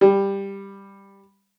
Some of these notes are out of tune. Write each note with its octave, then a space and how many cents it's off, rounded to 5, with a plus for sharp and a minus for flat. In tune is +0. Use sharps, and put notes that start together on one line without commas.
G3 +10